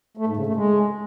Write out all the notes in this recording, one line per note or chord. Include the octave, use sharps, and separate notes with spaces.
A3
G#2
C#3
A3
G#3